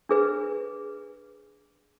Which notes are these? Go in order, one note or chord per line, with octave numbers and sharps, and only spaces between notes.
D4 G#4 B4